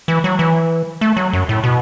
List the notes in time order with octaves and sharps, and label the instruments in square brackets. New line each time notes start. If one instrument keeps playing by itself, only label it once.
[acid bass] E3
F#3
E3
A3
F#3
F#2
A2
B2